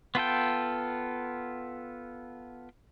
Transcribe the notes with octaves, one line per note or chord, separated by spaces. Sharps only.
B3 F4 A4 G5